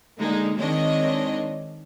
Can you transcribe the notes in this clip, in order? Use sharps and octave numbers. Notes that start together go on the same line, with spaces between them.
D3 G#3 A#3 D#4
D#3 G#3 C4 D4 C#5 D#5